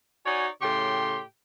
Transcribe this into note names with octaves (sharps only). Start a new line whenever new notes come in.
D#4 F#4 C#5 D5 G#5
A2 C#3 G4 G5 C6